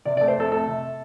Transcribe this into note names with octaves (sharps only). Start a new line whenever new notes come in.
C3 D5
D5
A3
C5
F2 A4
A3 A4
C3